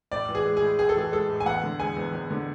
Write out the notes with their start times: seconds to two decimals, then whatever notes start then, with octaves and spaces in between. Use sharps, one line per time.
0.12 A2 D5
0.29 E3
0.35 G#4
0.45 G#3
0.57 G#4
0.62 A2
0.79 A2 G#4
0.89 A4
0.96 E3 G#4
1.12 G#3 A4
1.29 A2
1.40 G#5
1.46 E2 F#5
1.63 D3
1.80 G#3 G#5
1.97 E2
2.13 E2
2.30 D3